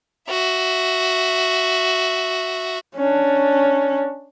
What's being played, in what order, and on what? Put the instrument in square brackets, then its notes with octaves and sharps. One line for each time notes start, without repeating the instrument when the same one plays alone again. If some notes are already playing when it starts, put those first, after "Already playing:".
[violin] F#4 E5
[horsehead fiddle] C#4 D4